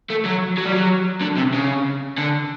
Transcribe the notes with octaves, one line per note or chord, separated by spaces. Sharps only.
A3
F#3
F#3
G3
F#3
D3
C3
C#3
D3